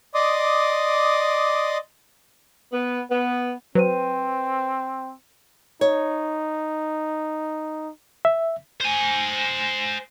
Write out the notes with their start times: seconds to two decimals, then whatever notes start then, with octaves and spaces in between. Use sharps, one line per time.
0.15 D5 D#5 C6 D6 D#6
2.72 B3
3.10 B3
3.75 F#3 C4 B4 C5 D#7
5.81 D#4 C#5
8.25 E5
8.81 C5 G#5